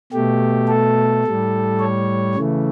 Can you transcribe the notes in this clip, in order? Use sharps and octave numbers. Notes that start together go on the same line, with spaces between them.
B2 A3 G4
A4
A2 G3
C#5
C#3 E3 A3